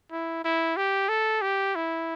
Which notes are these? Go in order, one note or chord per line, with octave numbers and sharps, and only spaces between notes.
E4
E4
G4
A4
G4
E4